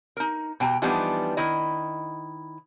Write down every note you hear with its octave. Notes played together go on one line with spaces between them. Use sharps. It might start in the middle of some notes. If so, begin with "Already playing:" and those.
D#4 A#4
B2 G5 G#5 A#5
E3 F3 G3 B3 D4 D#4
D#3 E4 D#5